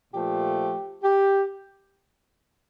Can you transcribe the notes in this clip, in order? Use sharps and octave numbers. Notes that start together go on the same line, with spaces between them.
A#2 F3 A3 G4
G4